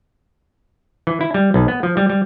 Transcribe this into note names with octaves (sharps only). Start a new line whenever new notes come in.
E3
E4
G3
B1
B3
F3
G3
G3